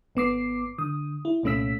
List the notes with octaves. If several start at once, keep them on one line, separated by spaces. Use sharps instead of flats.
G#1 B3 D6 C7
D3 D#6
E4
C2 A#2 A3 C#4 E6 B6